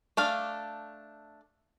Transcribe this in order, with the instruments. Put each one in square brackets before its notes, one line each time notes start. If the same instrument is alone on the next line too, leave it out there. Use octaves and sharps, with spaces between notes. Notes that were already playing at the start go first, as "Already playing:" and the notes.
[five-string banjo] A3 D4 F5